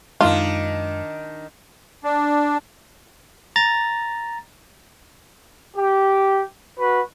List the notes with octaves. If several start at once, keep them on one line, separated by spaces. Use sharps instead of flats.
F#2 D#3 G#3 D4 F4
D4
A#5 A6
G4
F#4 B4